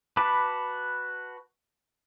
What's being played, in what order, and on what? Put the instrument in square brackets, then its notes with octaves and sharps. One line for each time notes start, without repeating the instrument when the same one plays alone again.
[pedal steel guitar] F#4 B4 A5 B5 D6